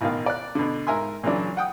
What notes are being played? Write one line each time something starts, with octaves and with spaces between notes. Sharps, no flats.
A1 B2 D#3 F5
D5 F#6
B2 D3
G#2 A#4 E5 G#5 C6
A#2 C#3 E3 F#3 D4
F#5 G5 D#6